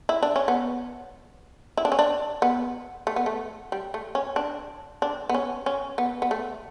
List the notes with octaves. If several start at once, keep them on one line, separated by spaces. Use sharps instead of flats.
E4
D4
C#4
B3
E4
D4
C#4
D4
B3
A3
B3
A3
G3
A3
C#4
D4
D4
B3
C#4
C#4
B3
B3
A3